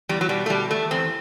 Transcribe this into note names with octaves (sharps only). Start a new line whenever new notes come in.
E2 G3
F#3
B2 G3
A3
B2 G3
E2 A3
E2 C4